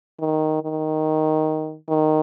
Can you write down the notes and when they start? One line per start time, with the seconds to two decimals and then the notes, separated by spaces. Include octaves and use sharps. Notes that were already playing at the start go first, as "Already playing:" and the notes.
0.20 D#3
0.62 D#3
1.89 D#3